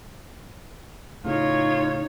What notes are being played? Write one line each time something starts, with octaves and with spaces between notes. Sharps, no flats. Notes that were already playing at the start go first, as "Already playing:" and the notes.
A2 C#3 D#4 F4 C#5